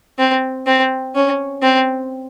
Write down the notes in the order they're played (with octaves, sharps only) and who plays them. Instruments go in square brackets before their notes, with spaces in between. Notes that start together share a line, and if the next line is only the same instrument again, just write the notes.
[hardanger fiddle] C4
C4
C#4
C4